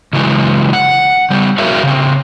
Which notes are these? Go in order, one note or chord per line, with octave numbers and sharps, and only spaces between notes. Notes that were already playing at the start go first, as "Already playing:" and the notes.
C#3 E3 F#3 G#3
F#5
C#3 G3
F#4 G#4 A#4 C#5 E5 F5
C#3 C4